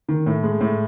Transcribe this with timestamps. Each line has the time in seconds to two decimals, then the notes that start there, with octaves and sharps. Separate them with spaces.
0.08 D#3
0.26 A2
0.43 G#3
0.61 A2